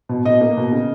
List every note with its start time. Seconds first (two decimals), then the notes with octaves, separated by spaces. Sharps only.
0.09 B2
0.25 B2 D#5
0.41 A#3
0.57 B2
0.72 C#3